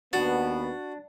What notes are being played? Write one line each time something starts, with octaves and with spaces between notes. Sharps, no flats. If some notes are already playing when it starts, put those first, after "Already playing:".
D#2 B3 D4 F#4